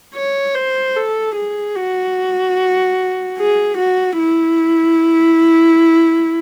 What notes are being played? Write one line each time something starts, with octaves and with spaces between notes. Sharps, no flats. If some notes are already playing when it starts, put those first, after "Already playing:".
C#5
C5
A4
G#4
F#4
G#4
F#4
E4